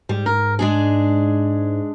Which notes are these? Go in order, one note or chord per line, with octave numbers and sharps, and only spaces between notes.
G#2 G3
A#4
G#3 D4 G#4